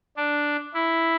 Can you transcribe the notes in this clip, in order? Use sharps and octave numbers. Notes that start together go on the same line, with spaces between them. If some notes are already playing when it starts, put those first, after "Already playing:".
D4
E4